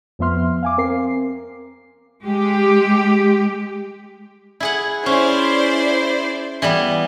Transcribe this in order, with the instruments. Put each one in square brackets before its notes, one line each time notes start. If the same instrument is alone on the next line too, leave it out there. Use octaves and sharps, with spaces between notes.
[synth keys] F2 F3 B3 E5 C6 F6
F5 G#5 D6
C4 A#4 C7
[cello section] G#3 G4
[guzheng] E4 G#4 F#5
[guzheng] C#4 [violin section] E4 C5 D5
[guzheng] E3 G3 B3